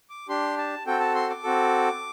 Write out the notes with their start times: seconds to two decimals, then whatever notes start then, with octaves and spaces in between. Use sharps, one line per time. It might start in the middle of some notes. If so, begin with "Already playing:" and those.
0.10 D6
0.29 D4 G4 C6
0.58 A5
0.86 C4 F#4 A4 G5
1.00 A5
1.15 C6
1.30 D6
1.43 C4 F#4 A4